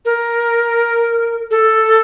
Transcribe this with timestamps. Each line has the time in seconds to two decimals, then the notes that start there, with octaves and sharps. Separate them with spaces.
0.05 A#4
1.51 A4